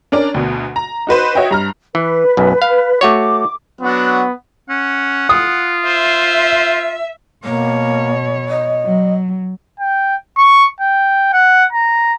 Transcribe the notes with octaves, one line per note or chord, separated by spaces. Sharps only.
C#4 D4 A#4 D5
D2 B2
A#5
D#4 F#4 B4 C5
F#4 C#5 D#5 E5 G5
G2 A#5 F6
E3 B4
B1 F#2
F5
A3 F#4 C#5 D6
F#3 B3 D4 F#4
C#4 F#5
F4 D#6
C5 E5
B2 A#3 C#5
D#5
F#3
G5
C#6
G5
F#5
A#5